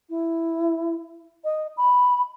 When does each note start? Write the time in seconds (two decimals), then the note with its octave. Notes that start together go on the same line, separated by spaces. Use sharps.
0.10 E4
1.44 D#5
1.77 B5